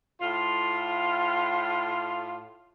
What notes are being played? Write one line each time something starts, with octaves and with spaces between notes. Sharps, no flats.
A2 F4